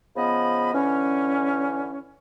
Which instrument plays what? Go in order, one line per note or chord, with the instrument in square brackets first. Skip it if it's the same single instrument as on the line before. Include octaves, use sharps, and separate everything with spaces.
[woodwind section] C#3 F3 B3 D#5 B5
D3 E3 C#4